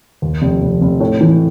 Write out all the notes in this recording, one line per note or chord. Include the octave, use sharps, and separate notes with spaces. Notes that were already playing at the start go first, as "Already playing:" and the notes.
D#2
F1
F1
F1
A2
E3